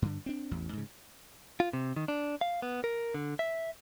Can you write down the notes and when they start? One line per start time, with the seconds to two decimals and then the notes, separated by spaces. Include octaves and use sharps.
0.02 G2 D3
0.26 C4 D4
0.51 A1 E2
0.73 G#2 C#3
1.60 F4
1.73 C3
1.96 D#3
2.08 D4
2.41 F5
2.62 B3
2.84 A#4
3.14 D3
3.39 E5